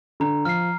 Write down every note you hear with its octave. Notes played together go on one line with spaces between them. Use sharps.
D3 A#5
F3 F6 C7